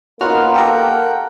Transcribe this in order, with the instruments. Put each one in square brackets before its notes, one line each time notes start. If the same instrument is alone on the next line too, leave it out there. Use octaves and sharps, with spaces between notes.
[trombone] A#3 [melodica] B3 D#4 F4 [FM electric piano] C#4 F#4 F6
[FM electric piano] G4 A4 A#4 [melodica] F#5 G5